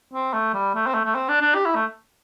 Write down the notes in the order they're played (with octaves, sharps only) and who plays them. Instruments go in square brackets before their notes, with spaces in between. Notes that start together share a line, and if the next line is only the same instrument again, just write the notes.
[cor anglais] C4
A3
G3
A3
C4
A3
A3
C4
D4
D4
G4
E4
A3